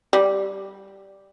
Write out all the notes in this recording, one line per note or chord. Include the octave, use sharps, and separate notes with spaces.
G3